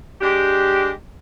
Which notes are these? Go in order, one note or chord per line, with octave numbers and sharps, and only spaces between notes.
G#3 D4 G4